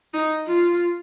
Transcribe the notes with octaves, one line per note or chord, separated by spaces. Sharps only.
D#4
F4